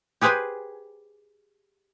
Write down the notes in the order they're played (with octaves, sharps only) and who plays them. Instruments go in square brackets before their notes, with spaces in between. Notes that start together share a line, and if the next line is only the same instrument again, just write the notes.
[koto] G4 G#4 B4 C5 G5 G#5